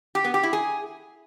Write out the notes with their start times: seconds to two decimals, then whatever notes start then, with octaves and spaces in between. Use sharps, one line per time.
0.15 G4
0.24 B3
0.34 G4
0.43 E4
0.53 G#4